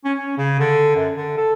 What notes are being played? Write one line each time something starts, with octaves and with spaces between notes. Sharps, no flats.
C#4
C#4
C#3
D3
F#2
D3
A4